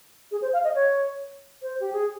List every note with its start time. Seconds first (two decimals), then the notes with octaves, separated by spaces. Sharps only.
0.31 G#4
0.42 C5
0.53 F5
0.64 D#5
0.75 C#5
1.62 C5
1.80 G4
1.93 G#4